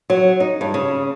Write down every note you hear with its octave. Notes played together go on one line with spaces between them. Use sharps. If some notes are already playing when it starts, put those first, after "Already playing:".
F#3
D#4
G2
C#3